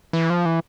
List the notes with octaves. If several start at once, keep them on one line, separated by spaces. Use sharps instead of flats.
E3
F3
E3